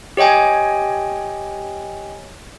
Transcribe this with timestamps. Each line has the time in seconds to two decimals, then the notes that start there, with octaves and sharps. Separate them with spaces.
0.17 G4 C#5 D#5 G5 G#5